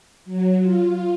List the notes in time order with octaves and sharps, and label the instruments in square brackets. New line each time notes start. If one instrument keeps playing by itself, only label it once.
[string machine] F#3
F4